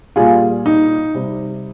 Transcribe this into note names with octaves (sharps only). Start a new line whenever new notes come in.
A#2 G3 F4 G#4
D#4
C3 G3